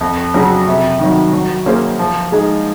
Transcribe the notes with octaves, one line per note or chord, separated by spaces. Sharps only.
F2
C#3 F#3 C#4
C3
D#3 F#3
F#3
A#3 C#4 G#4 C5
F3
G#3 D#4 G#4